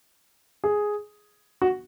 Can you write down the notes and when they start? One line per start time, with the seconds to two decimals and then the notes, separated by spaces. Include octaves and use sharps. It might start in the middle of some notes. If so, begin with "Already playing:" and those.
0.64 G#4
1.62 F#4